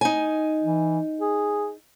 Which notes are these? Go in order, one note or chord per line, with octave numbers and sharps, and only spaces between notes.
D#4 G#5
E3
G#4